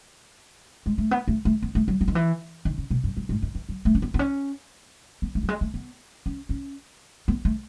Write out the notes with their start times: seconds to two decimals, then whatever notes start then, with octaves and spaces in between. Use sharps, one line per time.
0.86 G#3
0.98 A3
1.11 B3
1.28 A3
1.45 A3
1.62 B3
1.75 A3
1.88 F#3
2.01 E3
2.08 D#3
2.15 E3
2.65 D#3
2.78 C#3
2.90 B2
3.04 F#2
3.17 F#2
3.29 G#2
3.42 D#3
3.55 E3
3.69 F#3
3.85 A3
3.95 C#4
4.02 B3
4.14 B3
4.19 C#4
5.22 B3
5.35 A3
5.43 F#3
5.48 G#3
5.61 A3
5.74 B3
6.26 C#4
6.49 C#4
7.28 B3
7.45 A3